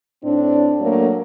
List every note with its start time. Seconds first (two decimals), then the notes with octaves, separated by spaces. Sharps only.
0.23 A2 C4 D4
0.80 F#3 A3 A#3 D4